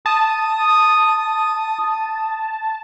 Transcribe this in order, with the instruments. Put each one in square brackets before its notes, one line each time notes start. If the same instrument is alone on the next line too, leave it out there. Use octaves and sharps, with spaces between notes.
[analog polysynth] A5 [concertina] D#6